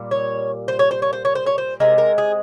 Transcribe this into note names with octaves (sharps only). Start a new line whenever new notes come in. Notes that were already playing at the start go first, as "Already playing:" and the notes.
Already playing: A#2 G3
C#5
C5
C#5
C5
C#5
C5
C#5
C5
C#5
C5
C3 F3 G#3 A#4
A#4
G#4